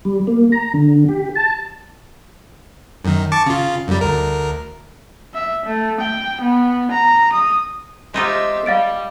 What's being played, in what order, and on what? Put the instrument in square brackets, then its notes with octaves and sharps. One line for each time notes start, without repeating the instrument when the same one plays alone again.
[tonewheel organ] G3
A#3
A#5
D3
G4
A5
[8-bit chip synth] F#2 D#3
A5 C#6 D6
C#3 F4
F#2 G3
D2 A#4
[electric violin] E5
A3
G5
B3
A#5
D#6
[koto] G#3 D#4 F4 [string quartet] G4 C5 E5
[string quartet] G3 G4 [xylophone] F5 A6 D7